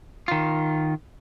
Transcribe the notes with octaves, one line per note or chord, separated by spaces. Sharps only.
D#3 F4